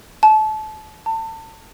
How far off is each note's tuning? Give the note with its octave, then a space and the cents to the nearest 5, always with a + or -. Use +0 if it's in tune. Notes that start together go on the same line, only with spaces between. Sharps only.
A5 -30
A5 +30